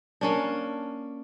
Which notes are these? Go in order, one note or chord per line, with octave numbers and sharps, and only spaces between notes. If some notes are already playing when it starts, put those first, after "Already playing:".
A#3 C#4 D4